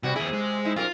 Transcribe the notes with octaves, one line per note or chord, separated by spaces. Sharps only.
C3 G3 B3 F#4
D#2 C3 E4 G#4
G#3
D#4 E4
F#2 B2 F4 A#4